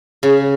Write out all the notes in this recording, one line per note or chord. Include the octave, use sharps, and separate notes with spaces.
C#3